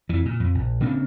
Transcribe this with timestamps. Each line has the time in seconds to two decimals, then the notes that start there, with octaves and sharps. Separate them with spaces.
0.09 F2 E3
0.25 A#2
0.40 F2
0.55 A#1
0.81 C#3 A#3 C4 D4